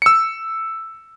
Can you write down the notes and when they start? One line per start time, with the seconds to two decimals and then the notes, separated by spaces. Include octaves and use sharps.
0.02 E6 C#7